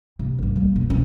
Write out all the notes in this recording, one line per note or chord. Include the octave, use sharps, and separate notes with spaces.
C3
A1 G2
G3 A#3
F#2 B2
C#4 E4